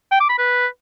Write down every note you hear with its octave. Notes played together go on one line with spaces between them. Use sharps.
G5
D6
B5
B4